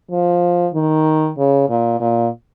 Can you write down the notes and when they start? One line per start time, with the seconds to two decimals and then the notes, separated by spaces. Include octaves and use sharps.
0.11 F3
0.74 D#3
1.38 C#3
1.69 A#2
2.00 A#2